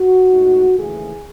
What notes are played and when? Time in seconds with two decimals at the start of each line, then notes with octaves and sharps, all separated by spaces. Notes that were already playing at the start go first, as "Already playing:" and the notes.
Already playing: F#4
0.30 A2 G#3 D#4
0.77 D#2 C#3 E3 A3 G#4